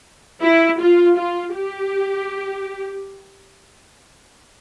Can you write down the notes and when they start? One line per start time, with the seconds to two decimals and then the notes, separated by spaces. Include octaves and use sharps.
0.41 E4
0.80 F4
1.17 F4
1.54 G4